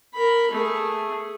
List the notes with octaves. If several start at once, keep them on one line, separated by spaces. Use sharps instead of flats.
A#4 B5
A3 G#4